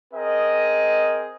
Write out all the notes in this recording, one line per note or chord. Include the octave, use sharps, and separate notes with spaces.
C4 G#4 A#4 D#5